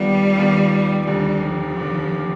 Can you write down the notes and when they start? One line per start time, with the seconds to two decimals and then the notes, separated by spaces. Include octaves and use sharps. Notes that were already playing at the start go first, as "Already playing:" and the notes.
Already playing: D#2 D#3 G3 B3 F4
0.35 D#2 D#3 B3 F4
1.06 F1 D#2 D3 G3
1.42 F3
1.77 F1 D#2 D3